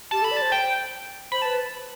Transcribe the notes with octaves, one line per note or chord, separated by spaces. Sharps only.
G4 A5
A4 B5
D5
A5
C5
G5
C5 B5
B4 A5